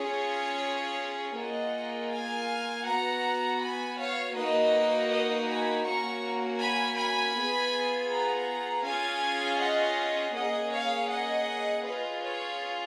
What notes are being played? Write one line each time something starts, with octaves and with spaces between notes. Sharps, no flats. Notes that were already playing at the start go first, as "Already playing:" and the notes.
Already playing: C#4 F4 G#4 C#5
A#3 F4 G#4 D#5 F#5
F5 G#5
B3 F#4 F#5 A#5
G#5 B5
C#5 F5
A#3 D#4 F#4 B4 D#5
B4 D#5
G#5 B5
A#3 C#4 F#4 A#5 C#6
G#5 B5
G#5 B5
B3 F4 G#4
F#5 A#5
C#4 F4 G#4 F5 G#5
D#5 F#5
A#3 C#4 G#4 D#5 F#5
C#5 F5
D#5 F#5
C#4 F4 G#4 B4 D#5
C#5